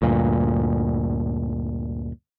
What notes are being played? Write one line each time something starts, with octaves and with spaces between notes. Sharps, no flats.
D2 G2 A#2